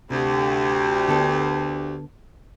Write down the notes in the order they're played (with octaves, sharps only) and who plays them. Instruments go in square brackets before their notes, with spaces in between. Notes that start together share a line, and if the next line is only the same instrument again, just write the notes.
[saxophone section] D2 [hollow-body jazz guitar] C3 [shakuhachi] G4
[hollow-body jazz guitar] D3 B3 A4